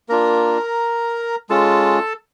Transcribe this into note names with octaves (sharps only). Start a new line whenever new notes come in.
A#3 D4 F4 A#4 A#5
G#3 C#4 F4 A4 A5